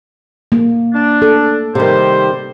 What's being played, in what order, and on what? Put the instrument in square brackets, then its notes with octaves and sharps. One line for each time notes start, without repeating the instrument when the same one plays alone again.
[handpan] A#3
[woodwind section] D4
[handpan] A4
[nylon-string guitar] C3 D#3 [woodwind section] G3 C5